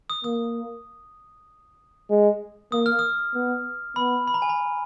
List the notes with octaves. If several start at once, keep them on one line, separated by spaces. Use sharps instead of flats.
D#6
A#3 D#6
G#3
A#3 D#6
F6
D#6
B3
B3 B5
B5
A#5
G#5
A#5